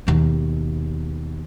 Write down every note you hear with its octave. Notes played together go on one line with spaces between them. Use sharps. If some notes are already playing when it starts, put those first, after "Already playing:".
D#2 B2